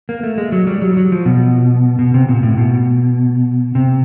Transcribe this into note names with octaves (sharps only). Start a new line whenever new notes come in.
A#3
A3
G#3
F#3
G3
F#3
F#3
F3
B2
B2
C3
A#2
A2
B2
C3